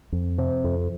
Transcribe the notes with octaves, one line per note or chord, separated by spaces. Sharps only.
F2
C3
F2